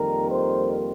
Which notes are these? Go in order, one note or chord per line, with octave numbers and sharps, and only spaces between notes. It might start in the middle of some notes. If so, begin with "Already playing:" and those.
Already playing: F2 D#3 G3 A#3 A#4
C5